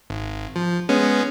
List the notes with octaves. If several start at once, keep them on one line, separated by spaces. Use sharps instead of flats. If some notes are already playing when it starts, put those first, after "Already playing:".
G#1
F3
G#3 B3 C#4